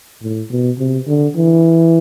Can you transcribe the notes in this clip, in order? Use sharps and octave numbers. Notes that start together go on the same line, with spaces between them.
A2
B2
C3
D3
E3